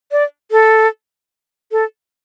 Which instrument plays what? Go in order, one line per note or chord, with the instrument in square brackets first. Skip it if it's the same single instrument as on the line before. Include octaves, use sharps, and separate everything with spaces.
[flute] D5
A4
A4